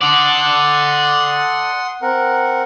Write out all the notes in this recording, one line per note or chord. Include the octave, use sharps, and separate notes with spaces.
A4 D5 F#5 C6 D#6
C4 A#4 F#5